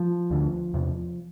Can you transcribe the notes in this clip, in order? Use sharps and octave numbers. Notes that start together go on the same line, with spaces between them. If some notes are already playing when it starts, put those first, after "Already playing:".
Already playing: F3
D2 D3
E2 C3